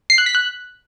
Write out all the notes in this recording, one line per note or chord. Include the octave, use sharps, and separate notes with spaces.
C7
F#6
B6
F#6